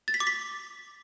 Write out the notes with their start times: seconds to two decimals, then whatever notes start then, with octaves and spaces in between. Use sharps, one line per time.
0.08 A6
0.14 B6
0.20 D6
0.27 B6